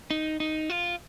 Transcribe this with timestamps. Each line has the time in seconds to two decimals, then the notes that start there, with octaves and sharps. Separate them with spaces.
0.11 D#4
0.40 D#4
0.70 F4